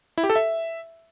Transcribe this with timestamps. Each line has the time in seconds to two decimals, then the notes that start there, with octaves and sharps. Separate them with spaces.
0.18 E4
0.24 G4
0.30 A4
0.36 E5